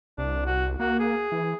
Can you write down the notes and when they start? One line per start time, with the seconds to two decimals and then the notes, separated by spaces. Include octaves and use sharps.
0.18 C2 D4
0.46 F#4
0.79 A#3 F#4
1.00 G#4
1.32 E3